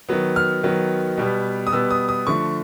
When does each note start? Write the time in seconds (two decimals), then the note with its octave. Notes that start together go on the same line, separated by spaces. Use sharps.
0.09 D#3 F#3 B3
0.36 F6
0.63 D#3 F#3 B3
1.18 B2 G3 B3
1.67 D#6
1.72 B2 G3 B3 E6
1.91 D#6
2.09 D#6
2.27 D3 F3 A3 C#6